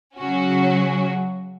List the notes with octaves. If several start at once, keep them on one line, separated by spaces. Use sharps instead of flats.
C#3 F#3 C#4 F#4